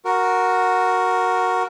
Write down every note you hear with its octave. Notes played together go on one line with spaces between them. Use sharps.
F#4 A#4